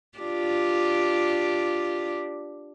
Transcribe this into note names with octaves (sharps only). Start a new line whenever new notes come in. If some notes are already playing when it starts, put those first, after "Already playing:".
D4 F4 G4